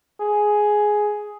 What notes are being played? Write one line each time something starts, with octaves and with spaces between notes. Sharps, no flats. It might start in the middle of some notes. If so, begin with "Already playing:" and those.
G#4